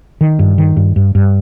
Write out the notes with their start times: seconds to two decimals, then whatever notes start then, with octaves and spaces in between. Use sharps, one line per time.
0.21 D#3
0.39 G2
0.58 D#3
0.76 G2
0.96 G2
1.15 G2